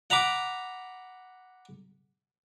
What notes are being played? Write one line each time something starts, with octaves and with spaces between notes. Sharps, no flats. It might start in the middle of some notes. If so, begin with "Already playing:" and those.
F#5 A#5 B5 D6